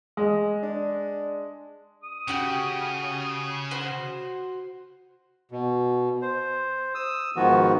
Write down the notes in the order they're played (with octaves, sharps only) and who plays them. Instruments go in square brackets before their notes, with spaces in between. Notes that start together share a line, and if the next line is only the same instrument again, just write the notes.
[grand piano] G#3
[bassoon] D4
[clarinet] D#6
[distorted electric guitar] C#3 [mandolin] C#4 F#4 G4
[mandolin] F#4 C5
[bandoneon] B2
C5
D#6 E6
G#2 D#3 F3 B3 F#4